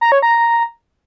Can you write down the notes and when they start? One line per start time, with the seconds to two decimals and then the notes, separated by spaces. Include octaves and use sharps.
0.01 A#5
0.12 C#5
0.22 A#5